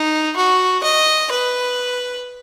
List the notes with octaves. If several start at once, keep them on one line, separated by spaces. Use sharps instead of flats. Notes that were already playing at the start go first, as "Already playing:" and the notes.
Already playing: D#4
F#4
D#5
B4